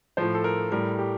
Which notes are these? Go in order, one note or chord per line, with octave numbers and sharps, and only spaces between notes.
A2 F3 C5
A4
A#4
A2 G3 A#4
G4